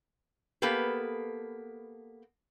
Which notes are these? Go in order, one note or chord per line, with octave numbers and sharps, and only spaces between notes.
A#3 B3 G4 A4 B4